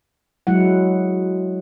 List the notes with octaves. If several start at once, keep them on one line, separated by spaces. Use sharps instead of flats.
F#3 G#3 E4 F#5